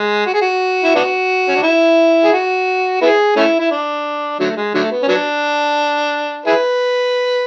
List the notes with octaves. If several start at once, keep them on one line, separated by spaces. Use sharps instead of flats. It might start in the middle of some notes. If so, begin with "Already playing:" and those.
Already playing: G#3
F#4
G#4
F#4
E4
B3 D4 F#4
C#4
D4
E4
G#4
F#4
B3 E4 G#4
A3 C#4 E4
E4
D4
D3 F#3 A3
G#3
D3 F#3 A3
B3
C#4
F#3 B3 D4
E4 G#4 B4